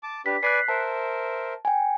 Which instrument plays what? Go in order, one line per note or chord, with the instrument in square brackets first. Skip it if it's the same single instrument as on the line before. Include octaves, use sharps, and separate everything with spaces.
[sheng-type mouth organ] A5 D6
[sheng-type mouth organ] D4 G4 B4 [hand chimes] B6
[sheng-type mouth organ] B4 D5 G#5 [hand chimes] F#6 B6 C7
[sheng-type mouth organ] A#4 C5 E5 [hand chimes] A5
[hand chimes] G5 G#5